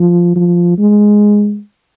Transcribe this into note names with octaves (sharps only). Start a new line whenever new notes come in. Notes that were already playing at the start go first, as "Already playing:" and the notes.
Already playing: F3
F3
G#3